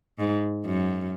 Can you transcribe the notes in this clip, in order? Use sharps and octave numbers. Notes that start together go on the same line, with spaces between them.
G#2
F#2